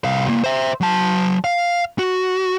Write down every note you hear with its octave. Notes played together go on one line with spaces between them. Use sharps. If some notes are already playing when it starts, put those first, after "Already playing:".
C2 F5
C3 A#3
C5 E5
F#3 A5
F5
F#4